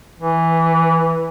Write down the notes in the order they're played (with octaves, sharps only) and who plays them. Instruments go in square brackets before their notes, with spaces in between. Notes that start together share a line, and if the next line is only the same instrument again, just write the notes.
[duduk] E3